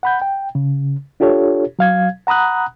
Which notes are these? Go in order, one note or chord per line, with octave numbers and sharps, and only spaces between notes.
F#5 B5 G6
G5
C#3
D4 F4 G4 A4 C#5
F#3 F5 G#6
F#5 A#5 B5 D#6 F#6